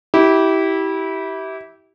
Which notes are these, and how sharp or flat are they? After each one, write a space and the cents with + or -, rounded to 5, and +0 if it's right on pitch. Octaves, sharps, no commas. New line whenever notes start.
E4 -20 G4 -20